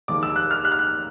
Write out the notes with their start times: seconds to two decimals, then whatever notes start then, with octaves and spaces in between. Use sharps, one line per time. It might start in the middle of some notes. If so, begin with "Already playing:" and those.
0.08 F1 D#2 D#3 G#3 D6
0.23 E6
0.36 F#6
0.51 F6
0.65 F#6
0.72 F6
0.79 F#6